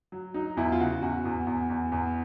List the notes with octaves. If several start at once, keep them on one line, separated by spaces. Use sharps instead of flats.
F#3
F#3 D#4
E2 E4
F4
C#3 F#4
E2 F#4
E2
E2
E2
E2